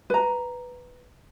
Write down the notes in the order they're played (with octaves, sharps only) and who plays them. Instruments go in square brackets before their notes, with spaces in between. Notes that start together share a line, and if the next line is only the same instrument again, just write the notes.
[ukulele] B4 A#5